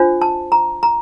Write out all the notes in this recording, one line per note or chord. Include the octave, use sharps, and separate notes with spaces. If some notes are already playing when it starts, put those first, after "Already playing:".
Already playing: D4 F4 C5
A5
A#5
A#5